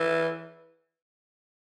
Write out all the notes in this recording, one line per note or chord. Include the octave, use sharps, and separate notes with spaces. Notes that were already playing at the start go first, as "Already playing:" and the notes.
Already playing: E3